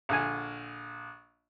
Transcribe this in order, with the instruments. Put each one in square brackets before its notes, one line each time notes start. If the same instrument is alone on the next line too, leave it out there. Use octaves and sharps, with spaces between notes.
[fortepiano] A#1 D3 G#5